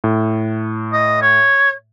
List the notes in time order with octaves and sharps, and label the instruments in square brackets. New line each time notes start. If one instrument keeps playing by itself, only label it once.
[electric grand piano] A2
[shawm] D#5
C#5